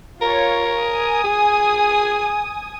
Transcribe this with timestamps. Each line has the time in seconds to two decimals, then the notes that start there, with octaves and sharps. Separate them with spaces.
0.22 F4 A#4 C#5
0.79 G#5 D#6
1.24 G#4